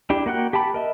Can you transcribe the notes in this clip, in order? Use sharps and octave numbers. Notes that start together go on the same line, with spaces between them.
D4 E4 G4
A#3 F#4 F#5 G5 F#6
G4 G5 A5 B5
A#4 D#5 E5